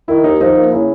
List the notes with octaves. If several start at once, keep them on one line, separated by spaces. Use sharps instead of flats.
D#3 E4
D#2 D#4
F3 D#4
A#3
C#3 E4